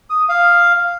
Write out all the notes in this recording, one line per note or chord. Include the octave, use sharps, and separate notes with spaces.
D#6
F5